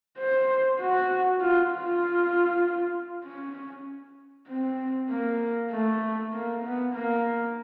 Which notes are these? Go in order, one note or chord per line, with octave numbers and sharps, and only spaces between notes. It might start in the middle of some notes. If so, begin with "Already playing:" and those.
C5
F#4
F4
F4
C#4
C4
A#3
A3
A#3
B3
A#3